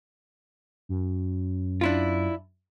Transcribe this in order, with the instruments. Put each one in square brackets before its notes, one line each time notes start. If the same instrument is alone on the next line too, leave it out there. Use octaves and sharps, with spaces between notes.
[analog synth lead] F#2
[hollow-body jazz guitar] D4 E4 F4